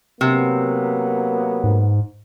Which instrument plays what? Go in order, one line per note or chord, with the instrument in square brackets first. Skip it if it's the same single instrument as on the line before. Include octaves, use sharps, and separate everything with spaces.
[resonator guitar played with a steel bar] C3 [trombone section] F#3 A#3 B3
[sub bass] G#2